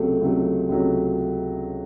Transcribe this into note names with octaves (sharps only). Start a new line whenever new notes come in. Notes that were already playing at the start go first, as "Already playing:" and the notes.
Already playing: C#2 C3 F#3 A3
C#2 C3 F#3 A3
C#2 C3 F#3 A3